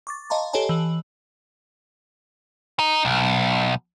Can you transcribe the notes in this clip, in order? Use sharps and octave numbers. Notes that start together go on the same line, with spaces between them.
C#6 D6 A6
D#5 F5 A5 A#5 C6
G4 A4 C#5 D#5 G#5 A5
E3 F#7
D#4
B1